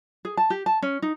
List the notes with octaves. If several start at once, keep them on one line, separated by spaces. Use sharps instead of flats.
G#4
A5
G4
A5
C#4
D#4